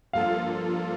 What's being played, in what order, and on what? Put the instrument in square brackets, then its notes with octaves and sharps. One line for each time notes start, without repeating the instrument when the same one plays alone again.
[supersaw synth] G2 F3 A#3 F4 A4 [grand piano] F5